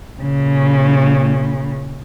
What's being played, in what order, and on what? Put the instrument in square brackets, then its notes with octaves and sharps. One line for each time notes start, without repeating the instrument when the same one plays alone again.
[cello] A#2 C#3